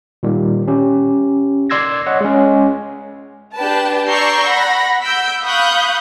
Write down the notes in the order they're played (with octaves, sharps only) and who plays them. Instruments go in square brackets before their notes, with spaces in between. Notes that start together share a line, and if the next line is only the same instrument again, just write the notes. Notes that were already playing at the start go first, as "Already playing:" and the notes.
[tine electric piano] A#2 D#3 G3
C#4 G4
D5 C6 E6 G#6 A#6
C#5 D#5 F#5
G#3 C#4
[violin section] D4 G4 B4 A5
D5 A#5 C#6 E6 G6 C7
F#5 B5 A#6
F#5 E6 G6 B6 D7
F5 B5 C#6 D#6 F#6 G6